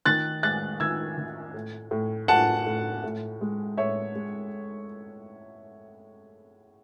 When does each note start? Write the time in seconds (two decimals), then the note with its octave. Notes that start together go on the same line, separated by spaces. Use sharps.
0.06 D#3 F#6 A6
0.43 G#3 F#6 A6
0.80 D#3 E6 G#6
1.18 D#3
1.54 A2
1.91 A2
2.28 A2 F#5 A5
2.67 A2
3.04 A2
3.41 G#3
3.77 A2 C#5 E5
4.15 G#3